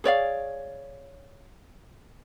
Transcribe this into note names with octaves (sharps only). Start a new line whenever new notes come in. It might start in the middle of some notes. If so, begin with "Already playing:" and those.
G#4 C#5 D5 F5